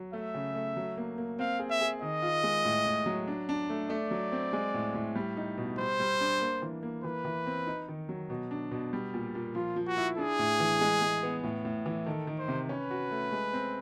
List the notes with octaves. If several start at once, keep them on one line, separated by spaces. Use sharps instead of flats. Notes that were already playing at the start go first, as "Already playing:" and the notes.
Already playing: F#3
A3 E5
C#3
A3
F#3
A#3
A#3
C4 F5
G#4
E5
G#4
D#3 D#5
F4
G#3
A2
A2
F#3
D4
D4
A3
A3 D5
F#3
C4
G#3
A2
A2
G3
D#4
B2
G3 C5
G3
D4
A#3
E3
A#3
E3 B4
E3
C4
D#4
D#3
F#3
B2
D4
B2
G3
A#2
A#2
F3 F4
F3
F#4
E4
D4 G#4
A2
E3
G#3
G#3
B3
A2
A2
E3
D#3 A4
D#3
C5
C3
C#4 B4
F#4
A3
G#3
C4